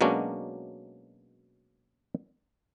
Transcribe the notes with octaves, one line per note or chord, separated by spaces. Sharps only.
B2 F#3 G#3 A#3 C#4 D4